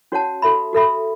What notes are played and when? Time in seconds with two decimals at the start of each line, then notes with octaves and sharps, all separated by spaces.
0.12 C#4 F#4 C#5 F#5 A5
0.42 F#4 A4 E5 B5
0.73 F#4 A4 E5 B5